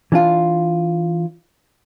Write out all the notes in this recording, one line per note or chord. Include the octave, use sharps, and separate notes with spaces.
E3 D4 F4